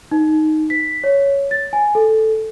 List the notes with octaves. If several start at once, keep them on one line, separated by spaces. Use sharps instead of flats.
D#4
B6
C#5
A6
G#5
A4